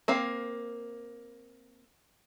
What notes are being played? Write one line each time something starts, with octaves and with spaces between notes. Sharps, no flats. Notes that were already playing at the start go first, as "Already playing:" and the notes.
A#3 C4 F5